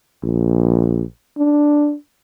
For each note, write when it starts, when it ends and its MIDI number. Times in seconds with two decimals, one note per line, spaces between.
0.23 1.03 34
1.38 1.95 62